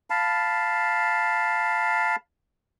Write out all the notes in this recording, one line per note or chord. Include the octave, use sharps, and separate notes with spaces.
F5 A5 B5